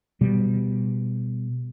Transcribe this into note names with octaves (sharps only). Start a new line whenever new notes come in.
B2 G3